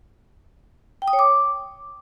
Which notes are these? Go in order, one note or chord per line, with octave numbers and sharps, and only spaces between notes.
G5
D#6
C#5
D6